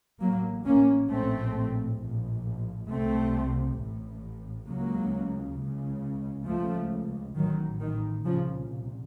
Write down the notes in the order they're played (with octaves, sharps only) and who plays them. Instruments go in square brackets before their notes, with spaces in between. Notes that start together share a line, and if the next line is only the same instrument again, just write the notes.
[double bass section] A1 A2 F#3 A#3
A#3 C#4
A#1 A2 A3 C4
A#1 A2
C2 C3 A3 C4
A1 A2
C#2 C#3 F#3 A#3
C#2 C#3
C#2 C#3 F3 A3
A1 A2 D#3 F#3
D#3
C2 A#2 C#3 F3